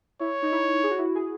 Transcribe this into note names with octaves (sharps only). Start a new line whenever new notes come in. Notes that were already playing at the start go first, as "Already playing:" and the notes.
E4 C#5
D#4
E4
G#4
F#4
E4
F#4
G#4